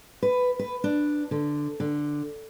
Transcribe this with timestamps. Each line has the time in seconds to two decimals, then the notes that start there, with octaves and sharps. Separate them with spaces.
0.23 B4
0.59 B4
0.84 D4
1.31 D3
1.80 D3